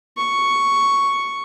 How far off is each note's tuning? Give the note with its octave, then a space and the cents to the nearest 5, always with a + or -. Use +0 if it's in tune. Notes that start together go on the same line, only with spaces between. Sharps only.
C#6 +5